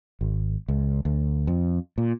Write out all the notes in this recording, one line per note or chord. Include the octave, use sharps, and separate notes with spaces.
G#1
C#2
D2
F2
A#2